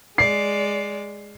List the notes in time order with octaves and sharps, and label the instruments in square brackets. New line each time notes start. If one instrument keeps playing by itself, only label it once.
[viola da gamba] G#3 [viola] D5 [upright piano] C7